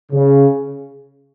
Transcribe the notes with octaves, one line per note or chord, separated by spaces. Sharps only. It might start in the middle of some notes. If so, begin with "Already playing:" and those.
C#3